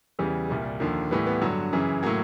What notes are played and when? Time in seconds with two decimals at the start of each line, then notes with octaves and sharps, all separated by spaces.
0.19 E2 C#3 E3 G3
0.49 C2 A#2 G3
0.80 D#2 D3 F3 A#3
1.11 A2 E3 G3 B3
1.26 B3
1.41 G2 D3 F#3
1.73 F#2 C#3 E3
2.03 A2 F#3 A#3